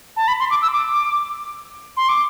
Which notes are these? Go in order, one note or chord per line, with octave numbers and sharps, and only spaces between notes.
A5
B5
C6
D6
E6
D6
C6
D6